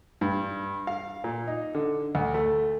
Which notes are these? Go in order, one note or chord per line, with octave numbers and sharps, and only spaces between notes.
G2
F5
A#2
D#4
D3
D2
A3